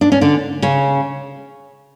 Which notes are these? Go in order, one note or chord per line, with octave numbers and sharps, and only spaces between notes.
D4
C#4
D3 D4
C#3 C#4